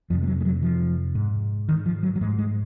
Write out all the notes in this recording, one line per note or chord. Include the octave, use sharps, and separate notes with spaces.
F2 C3 F3
G#3
F#3
G#3
F#3
F3
G#2
D#3
F3
F#3
F#3
G#2 G#3
G#3